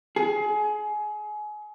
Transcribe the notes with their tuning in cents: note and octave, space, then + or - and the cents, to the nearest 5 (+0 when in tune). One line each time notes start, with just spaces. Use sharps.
G#4 +25